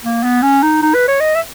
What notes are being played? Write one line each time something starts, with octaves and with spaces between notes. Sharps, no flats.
A#3
B3
C#4
D#4
D#4
B4
C#5
D#5
E5